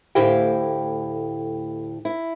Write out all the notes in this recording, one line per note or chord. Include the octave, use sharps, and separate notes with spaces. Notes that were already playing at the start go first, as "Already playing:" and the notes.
D2 A2 E4 G4 F5 G5
E4